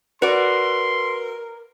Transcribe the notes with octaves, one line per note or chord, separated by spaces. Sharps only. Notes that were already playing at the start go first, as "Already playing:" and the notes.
F#4 A#4 B4 D5 C6